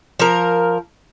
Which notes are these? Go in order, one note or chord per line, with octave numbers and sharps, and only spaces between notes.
F3 A#4